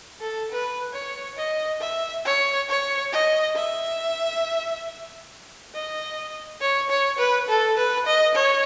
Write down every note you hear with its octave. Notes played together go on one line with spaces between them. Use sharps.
A4
B4
C#5
D#5
E5
C#5
C#5
D#5
E5
D#5
C#5
C#5
B4
A4
B4
D#5
C#5